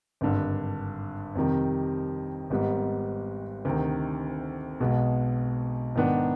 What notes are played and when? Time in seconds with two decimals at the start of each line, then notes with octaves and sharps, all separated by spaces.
0.21 G#1 G2 D3
1.35 F2 C3 D#3 G3
2.50 G#1 G#2 G3 B3
3.65 D2 C3 D#3
4.80 B1 B2 G#3 B3
5.95 G#2 D#3 B3 D4